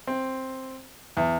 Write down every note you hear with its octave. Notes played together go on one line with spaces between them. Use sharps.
C4
E2